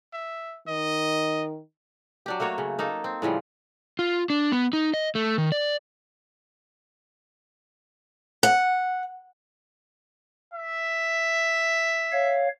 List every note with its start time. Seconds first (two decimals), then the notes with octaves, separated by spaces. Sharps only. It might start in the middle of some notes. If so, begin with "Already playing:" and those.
0.13 E5
0.68 D#3 D#5
2.26 F#3 D4 G4
2.40 A3 A#3 F#4 C#5
2.58 C#3
2.79 A#3 D#4 A4
3.04 C4
3.22 A2 C#3 F3 G3
3.99 F4
4.30 D4
4.52 B3
4.73 D#4
4.94 D#5
5.15 A3
5.38 D#3
5.52 D5
8.43 F#5
10.54 E5
12.12 C#5 F5